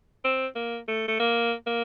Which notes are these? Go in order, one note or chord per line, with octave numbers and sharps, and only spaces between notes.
C4
A#3
A3
A3
A#3
A#3